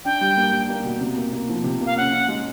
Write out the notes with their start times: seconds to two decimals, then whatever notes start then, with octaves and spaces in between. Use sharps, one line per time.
0.05 D4 G5
0.21 G3
0.37 A#3
0.53 G3
0.69 A#3
0.85 B2
1.01 C3
1.16 A#3
1.33 A#3
1.49 F3
1.64 C3
1.81 A#3 F5
1.97 C#4 F#5
2.13 C#4
2.29 G#3